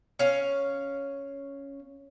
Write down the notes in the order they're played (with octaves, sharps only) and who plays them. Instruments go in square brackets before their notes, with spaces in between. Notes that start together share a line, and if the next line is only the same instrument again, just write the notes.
[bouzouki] C#4 F5